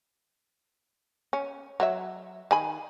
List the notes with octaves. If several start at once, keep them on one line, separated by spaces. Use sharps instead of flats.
C#4
F#3 C#5 E5
D#3 G#5 B5